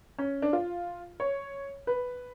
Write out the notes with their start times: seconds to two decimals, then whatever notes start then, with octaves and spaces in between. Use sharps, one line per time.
0.18 C#4
0.42 D4
0.53 F4
1.20 C#5
1.87 B4